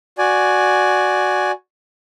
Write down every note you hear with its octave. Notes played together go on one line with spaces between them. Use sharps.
F#4 D5 G#5